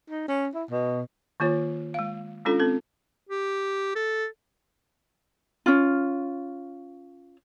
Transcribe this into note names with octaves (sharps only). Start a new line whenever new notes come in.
D#4
C#4
E4
B2
D#3 A#3 F4 C#5
G#3 F5
G#3 C#4 D4 F4 A4
C4 A4
G4
A4
C#4 F4